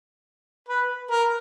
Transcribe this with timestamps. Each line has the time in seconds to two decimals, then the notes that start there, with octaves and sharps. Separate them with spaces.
0.68 B4
1.11 A#4